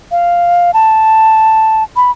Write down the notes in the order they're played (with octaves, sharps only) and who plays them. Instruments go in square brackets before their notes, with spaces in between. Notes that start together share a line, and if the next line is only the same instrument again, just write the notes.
[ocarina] F5
A5
B5